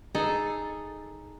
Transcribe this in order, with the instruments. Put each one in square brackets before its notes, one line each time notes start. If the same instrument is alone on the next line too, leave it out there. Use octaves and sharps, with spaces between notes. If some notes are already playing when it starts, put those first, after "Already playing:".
[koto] D#4 G#4 A4